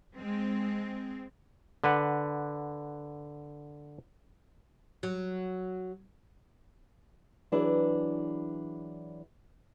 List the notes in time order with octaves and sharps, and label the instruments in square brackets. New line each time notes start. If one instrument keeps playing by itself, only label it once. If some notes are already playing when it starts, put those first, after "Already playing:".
[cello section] G#3 C4
[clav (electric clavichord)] D3 B4 F#5
[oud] F#3
[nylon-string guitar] E3 F#3 D4 E4 G#4 B4